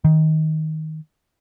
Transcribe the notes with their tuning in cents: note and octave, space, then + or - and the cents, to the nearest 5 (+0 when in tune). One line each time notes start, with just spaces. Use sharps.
D#3 +15